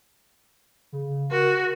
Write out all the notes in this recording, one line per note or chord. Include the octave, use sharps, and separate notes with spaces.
C#3
F#4 A#4